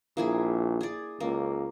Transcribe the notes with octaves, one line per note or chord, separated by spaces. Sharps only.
A#1 A#3 E4 G#4
G#4 D5
C#2 A#3